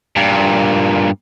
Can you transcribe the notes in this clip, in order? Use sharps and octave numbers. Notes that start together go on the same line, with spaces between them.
G2 A#2